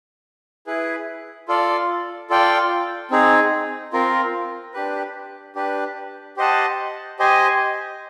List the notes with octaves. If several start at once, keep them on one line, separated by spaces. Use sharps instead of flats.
E4 G#4 B4
F4 A4 D5
F4 A4 D5 G5
C4 D#4 G#4
C4 F4 A#4
D4 G4 B4
D4 G4 B4
G4 C5 D#5 F#5 A5
G4 C5 D#5 G#5